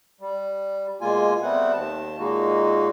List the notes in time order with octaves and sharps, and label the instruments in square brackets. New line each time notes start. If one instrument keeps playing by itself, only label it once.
[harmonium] G3
B2 G#3 A#3 F4 G#5
G3 A3 B3 C4 F#5
D#2 A5
A#2 G#3 A#3 D#4 F#4